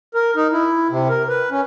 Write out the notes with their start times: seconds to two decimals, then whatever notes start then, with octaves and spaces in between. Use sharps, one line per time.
0.15 A#4
0.36 D#4
0.52 E4
0.90 C3
1.09 A#4
1.29 B4
1.51 C#4